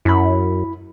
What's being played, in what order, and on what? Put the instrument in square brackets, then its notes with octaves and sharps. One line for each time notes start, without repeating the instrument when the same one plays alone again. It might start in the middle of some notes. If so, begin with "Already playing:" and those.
[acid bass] F#2 [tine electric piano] E4 B5